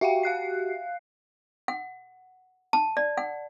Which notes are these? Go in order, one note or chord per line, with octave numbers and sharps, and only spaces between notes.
F#4 G4 E5 F5 G5
F5 F#6 C7
F#5
A5
D5
F#5